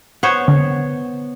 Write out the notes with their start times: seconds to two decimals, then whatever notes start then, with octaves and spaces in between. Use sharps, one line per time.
0.23 B3 C5 C#5
0.48 D3